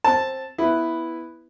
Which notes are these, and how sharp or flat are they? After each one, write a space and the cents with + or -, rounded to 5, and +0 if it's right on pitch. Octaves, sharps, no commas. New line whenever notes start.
C4 +15 A5 +0
B3 +0 E4 +0 B4 +0